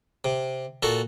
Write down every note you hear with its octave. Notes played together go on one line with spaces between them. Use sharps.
C3
A#2 F#4 A4